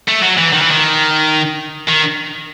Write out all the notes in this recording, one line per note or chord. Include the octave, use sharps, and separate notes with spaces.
A3
F#3
E3
D#3
E3
D#3
D#3